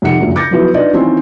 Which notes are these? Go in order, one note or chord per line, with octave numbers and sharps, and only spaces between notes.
F2 C3 D#3 F#5 C#7
F#1 D2 A#2 F3
D6 G6 A6 A#6 C#7
F3 F#3 B3 E4 F#4
D4 D#4 F4 B4 D5 D#5
D#3 E3 C4 C#4 F4